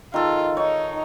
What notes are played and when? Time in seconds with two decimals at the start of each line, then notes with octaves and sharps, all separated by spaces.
0.14 D#3 F4 A4
0.57 D#4 C#5